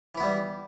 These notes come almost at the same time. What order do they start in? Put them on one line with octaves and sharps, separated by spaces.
E3 E4 B3 G3